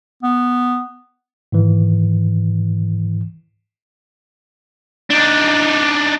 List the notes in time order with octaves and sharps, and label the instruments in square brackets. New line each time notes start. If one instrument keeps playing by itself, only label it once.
[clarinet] B3
[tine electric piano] G#2 D#3 E3
[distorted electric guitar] D4 D#4